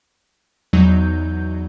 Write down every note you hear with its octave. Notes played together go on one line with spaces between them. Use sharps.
E2 F#3 D#4 G6